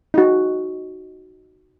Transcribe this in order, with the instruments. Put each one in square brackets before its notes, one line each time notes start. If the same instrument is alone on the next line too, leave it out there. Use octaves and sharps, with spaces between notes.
[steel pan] D#4 F#4